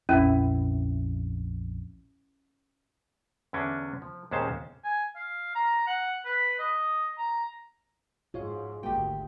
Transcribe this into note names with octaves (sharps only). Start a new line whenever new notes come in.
A#1 F2 C#4 E4
E2 D3 C#4 D4
F3
D#2 A#2 G#3 C#4 C5 A5
G#5
F5
A#5
F#5
B4
D#5
A#5
G#2 F4 F#4 C#5 F5
G#1 D2 G#3 A#3 F#4 G4 G5